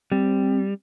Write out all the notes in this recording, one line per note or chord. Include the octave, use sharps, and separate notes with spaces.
G3 C4